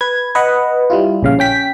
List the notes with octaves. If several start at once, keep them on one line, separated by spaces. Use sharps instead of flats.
B4 G#6
B4 D#5 F#5
G3 E4 F4
A#1 C#3 F5
C#4 G5 B6